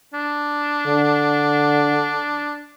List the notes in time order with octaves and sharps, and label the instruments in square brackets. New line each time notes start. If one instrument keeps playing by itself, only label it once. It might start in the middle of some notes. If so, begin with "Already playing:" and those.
[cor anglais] D4
[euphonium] D3